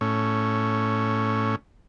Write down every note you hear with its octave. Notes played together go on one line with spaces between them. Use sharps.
A2 C#4